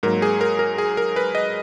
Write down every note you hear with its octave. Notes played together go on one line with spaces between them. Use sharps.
G#2 F#3 A#3 A#4
G#4
A#4
A#4
G#4
A#4
B4
D#5